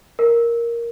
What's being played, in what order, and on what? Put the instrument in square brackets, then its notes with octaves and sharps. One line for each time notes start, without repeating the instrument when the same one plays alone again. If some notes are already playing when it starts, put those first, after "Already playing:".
[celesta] A#4